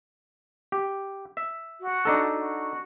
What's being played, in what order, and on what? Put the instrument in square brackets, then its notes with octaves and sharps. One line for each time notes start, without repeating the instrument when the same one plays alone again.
[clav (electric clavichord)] G4
E5
[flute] F#4
[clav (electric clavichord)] D4 D#4 A4
[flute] F#4